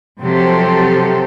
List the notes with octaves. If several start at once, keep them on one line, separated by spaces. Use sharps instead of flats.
C3 F3 F#3 G4 A4 C5